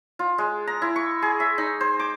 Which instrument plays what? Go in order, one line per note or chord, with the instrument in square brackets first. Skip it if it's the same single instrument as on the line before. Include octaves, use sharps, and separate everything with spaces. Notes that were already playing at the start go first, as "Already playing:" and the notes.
[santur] F4
G#3
A#5
E4
C#6
G#4
E5
D#4
C5
D6